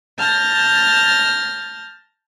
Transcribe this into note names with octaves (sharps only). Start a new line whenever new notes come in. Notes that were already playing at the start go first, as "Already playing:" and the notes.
A5 F6 G6 A6 A#6